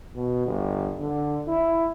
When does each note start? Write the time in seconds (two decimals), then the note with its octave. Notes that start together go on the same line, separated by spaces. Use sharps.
0.15 B2
0.46 G1
0.99 D3
1.47 E4